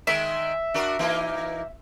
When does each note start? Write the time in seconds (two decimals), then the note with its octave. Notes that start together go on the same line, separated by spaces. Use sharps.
0.07 D#3 G#3 E5
0.74 D4 F#4 A#4
0.99 E3 A#3 D#4